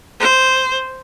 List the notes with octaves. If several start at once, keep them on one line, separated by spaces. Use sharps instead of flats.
C5